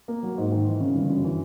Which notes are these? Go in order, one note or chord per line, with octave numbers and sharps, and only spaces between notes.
A#3
F#3
G#2
D#3
E3
C#3
G1
F#2
E3